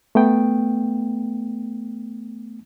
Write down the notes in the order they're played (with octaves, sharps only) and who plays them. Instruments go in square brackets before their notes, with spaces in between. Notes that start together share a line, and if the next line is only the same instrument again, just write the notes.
[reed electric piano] A3 B3 G5